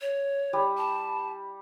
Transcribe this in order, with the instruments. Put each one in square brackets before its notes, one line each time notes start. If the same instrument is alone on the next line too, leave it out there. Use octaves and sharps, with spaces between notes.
[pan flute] C#5
[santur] G3
[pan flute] A5